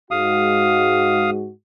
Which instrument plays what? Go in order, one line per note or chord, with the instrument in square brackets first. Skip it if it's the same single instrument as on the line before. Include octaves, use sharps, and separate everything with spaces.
[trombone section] G#2 G#3 F#4 [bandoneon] F5 D#6